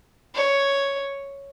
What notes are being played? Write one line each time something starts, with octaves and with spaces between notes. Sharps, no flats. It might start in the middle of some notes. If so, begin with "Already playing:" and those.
C#5